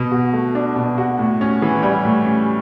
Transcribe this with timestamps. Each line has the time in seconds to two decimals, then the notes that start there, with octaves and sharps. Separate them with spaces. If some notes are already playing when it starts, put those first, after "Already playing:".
Already playing: B2
0.11 F#4
0.33 A3
0.55 D4
0.76 B2
0.98 F#4
1.19 A2
1.41 C#4
1.62 E3
1.83 G3
2.05 A2
2.26 C#4